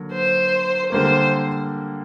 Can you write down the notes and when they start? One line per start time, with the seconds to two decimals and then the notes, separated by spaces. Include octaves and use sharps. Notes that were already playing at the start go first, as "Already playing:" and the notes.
Already playing: D3 F#3 A#3
0.13 C5
0.92 D3 G3 A#3 C5